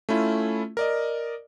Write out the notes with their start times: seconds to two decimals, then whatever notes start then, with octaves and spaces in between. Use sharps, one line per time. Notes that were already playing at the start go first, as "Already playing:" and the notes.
0.09 A3 C#4 E4 F4
0.77 A#4 D5 D#5